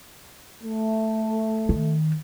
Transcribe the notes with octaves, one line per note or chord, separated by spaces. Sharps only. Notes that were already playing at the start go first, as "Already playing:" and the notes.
A3
D#3